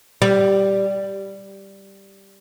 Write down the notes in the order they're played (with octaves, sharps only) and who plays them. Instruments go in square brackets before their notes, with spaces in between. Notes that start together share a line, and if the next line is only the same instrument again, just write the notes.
[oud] G3